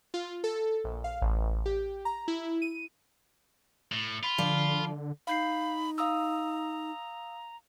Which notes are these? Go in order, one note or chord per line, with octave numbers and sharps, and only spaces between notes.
F4
A4
A#1
F5
A1
G4
A#5
E4
D#7
A2
F4 B5
D3 F3 D5
D#4 F5 B5 G6 C7
F5 A#5 D#6 E6